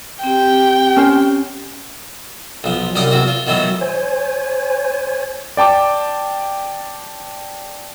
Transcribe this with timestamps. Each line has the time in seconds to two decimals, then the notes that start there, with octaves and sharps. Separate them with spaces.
0.23 C4 G4 G5
0.96 C#4 C5
2.64 B1 F3
2.95 C2 F#2 D#4 D5 D#5
3.11 E2 C4 F#4
3.28 F4
3.47 B2 D#3 E3 F#3 A3
3.81 C5 C#5 G#5
5.57 D5 G5 A5 D6